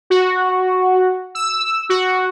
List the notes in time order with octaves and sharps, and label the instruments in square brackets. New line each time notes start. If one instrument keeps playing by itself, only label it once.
[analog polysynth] F#4
E6
F#4